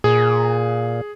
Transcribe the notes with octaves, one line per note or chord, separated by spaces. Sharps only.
A#2 G#4